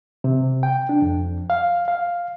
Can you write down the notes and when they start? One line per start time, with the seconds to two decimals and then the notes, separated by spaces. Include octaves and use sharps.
0.24 C3
0.63 G5
0.89 D4
1.02 F2
1.50 F5
1.88 F5